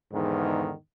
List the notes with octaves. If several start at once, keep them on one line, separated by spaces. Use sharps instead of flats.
E2 G#2 D3 D#3